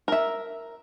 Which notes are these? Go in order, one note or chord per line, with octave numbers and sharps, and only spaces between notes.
A#4 E5